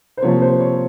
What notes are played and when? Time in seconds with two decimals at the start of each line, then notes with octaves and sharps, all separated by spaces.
0.17 C5
0.22 C3 F3 A#3 C#5
0.42 C5
0.60 C#5